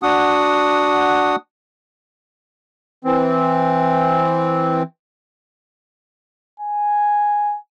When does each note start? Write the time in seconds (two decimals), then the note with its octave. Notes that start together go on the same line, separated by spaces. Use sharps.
0.03 D4 F#4 F#5 D#6
3.05 E3 C4
6.60 G#5